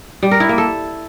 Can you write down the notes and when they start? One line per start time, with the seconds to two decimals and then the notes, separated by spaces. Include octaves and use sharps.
0.23 G3
0.31 A#4
0.40 E4
0.49 A#3
0.58 A4